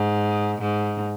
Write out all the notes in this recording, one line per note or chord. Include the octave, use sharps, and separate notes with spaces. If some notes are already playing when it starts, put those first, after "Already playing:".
Already playing: G#2
G#2